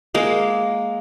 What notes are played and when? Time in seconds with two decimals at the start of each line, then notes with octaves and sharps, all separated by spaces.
0.15 G#3 A#3